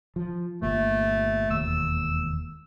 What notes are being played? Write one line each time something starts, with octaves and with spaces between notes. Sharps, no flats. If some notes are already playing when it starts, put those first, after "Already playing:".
F3
G1 A#2 A3
E1 D#2 E6